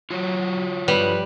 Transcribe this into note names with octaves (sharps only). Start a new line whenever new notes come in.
F#3 F4 F#4 C#5
G2 F3 G3 B4